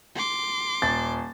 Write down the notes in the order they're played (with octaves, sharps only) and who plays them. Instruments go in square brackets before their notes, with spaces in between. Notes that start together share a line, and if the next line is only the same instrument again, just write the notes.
[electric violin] C6 D6
[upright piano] D#1 A6